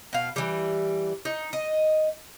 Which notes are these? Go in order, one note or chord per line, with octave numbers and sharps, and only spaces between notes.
B2 F5
E3 G3
D#4
D#5